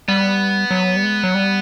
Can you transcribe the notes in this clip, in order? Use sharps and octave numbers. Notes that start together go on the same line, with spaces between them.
G3 B3
F#3
G3
G#3
F#3
G3